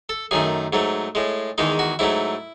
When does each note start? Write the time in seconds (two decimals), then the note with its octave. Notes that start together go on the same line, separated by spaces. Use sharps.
0.09 A4
0.31 F#2 D#3 A3 G#4
0.73 G#2 F#3 A3
1.15 A2 G#3
1.58 E2 D#3 G#3 D#4
1.79 F#4
1.99 G#2 F#3 A3 E4